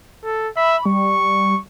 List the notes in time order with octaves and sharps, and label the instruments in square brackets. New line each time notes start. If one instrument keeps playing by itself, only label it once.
[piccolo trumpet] A4
[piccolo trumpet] E5 [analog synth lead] B5
[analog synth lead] G3 [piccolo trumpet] C#6